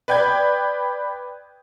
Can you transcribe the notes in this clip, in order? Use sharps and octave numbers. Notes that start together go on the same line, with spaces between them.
B4 D5 G5 G6 G#6